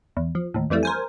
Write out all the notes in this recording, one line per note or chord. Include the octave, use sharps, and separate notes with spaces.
E2
F3
D#2 A2
F2 E3 G3 A3
A#4 C5 G#5